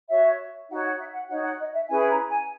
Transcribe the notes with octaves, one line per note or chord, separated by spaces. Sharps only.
F#4 C#5 E5
D#4 F#4 C#5 F#5
F#5
E5
F#5
D#4 F#4 C#5 F#5
F#5
D#5
E5
C#4 E4 G#4 B4 G#5
A#5
G#5